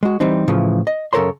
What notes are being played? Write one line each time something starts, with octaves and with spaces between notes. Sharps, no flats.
G#3 F#4
E3 G3 C4 D#4
A2 C#3 E3 F3
D#5
F#2 C#3 A4 A#4 C#5 C6